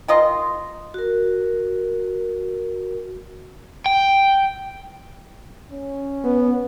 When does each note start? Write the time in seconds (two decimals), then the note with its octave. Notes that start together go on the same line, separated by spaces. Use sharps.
0.08 D#3 F4 D#5 C6
0.94 F#4 A#4
3.86 G5
5.72 C#4
6.24 B3